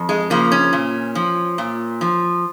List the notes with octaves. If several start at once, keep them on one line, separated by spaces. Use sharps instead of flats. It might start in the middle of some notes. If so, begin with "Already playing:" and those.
Already playing: F2
G#3
C#3 F3 A#3
C#4
A#2
F3
A#2
F3